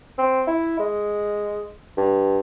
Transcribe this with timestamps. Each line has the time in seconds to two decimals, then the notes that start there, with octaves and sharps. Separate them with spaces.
0.18 C4
0.48 E4
0.79 G#3
1.97 G2